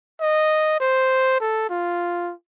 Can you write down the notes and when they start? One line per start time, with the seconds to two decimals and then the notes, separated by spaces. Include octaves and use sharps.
0.21 D#5
0.81 C5
1.41 A4
1.70 F4